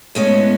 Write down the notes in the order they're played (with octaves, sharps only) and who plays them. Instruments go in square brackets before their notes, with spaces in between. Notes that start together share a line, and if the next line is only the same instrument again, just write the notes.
[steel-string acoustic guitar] A2 G#3 C#4 [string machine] B3